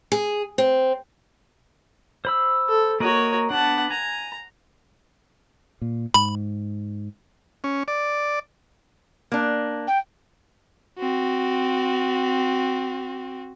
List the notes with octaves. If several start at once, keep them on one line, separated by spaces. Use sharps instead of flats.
G#4
C4
C5 B5 E6
A4
A#3 F#4 A#4 C#5 D#5
B3 D4 F#5 A5
G#5 A#5
A#2
G#2 B5
C#4
D5
A#3 D4
G5
C4 F#4